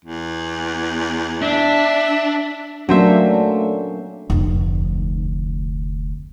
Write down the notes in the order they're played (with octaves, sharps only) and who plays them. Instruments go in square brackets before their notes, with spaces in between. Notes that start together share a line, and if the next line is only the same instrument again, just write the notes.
[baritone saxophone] E2
[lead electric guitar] D4 [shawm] E5
[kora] F#3 C5 E5 [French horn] A3 [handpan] A#3 C#4 D4
[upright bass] F1 D2